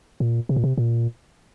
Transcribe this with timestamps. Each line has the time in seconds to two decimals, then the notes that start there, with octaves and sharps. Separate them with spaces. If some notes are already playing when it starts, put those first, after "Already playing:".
0.20 A#2
0.49 C3
0.56 A#2
0.64 C3
0.78 A#2